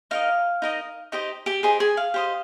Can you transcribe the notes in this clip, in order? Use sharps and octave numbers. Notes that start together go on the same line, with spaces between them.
D#4 A#4 D#5 F5
D#4 A#4 D#5
D#4 G4 C5 D#5
G4 G5
D#4 G4 G#4 C5 G#5
G#4 G#5
F5
G4 C5 D#5